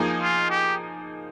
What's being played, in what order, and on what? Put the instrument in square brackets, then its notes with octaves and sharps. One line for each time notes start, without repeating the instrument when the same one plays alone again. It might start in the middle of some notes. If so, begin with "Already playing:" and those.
Already playing: [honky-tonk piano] F3 A#3 D#4 G#4
[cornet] F4
G4